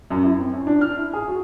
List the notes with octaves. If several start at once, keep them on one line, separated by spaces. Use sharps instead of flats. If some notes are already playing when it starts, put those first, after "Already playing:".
F#2
E4
C4
C#4
D4
F6
E4
G#4
F#4